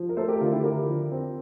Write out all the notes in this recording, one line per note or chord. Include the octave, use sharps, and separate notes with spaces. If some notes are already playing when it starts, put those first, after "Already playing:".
Already playing: F3
A#4
A3 A4 C5
G4 A#4
D3 F4
E4 G4
D3 G4 A#4
F3
C4